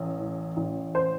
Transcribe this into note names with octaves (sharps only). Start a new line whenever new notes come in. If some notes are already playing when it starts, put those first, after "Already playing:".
Already playing: A1 E3
A2
A1
C5